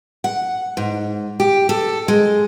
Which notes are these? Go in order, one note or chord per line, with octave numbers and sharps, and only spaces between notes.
F#5
G#2
G4
A4
G#3